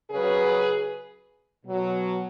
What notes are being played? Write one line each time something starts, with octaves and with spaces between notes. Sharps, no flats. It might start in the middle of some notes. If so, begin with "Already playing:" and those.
C#3 F#3 G#4 B4
B2 F#3